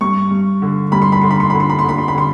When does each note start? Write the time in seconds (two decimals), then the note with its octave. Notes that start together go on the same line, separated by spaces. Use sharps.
0.01 G2 C#6
0.31 G2
0.62 D3
0.92 G2 B5
1.02 C6
1.12 B5
1.21 D3 C6
1.31 B5
1.40 C6
1.50 D3 B5
1.60 C6
1.70 B5
1.79 C6
1.84 D3 B5
1.98 C6
2.08 B5
2.15 D3 C6